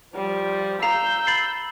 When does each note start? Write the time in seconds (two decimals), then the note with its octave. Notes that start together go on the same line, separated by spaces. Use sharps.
0.16 F3 G3
0.82 F5 A#5 E6 G6
1.27 B5 A6 C7